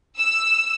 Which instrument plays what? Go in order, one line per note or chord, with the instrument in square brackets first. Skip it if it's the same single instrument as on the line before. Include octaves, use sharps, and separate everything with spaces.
[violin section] E6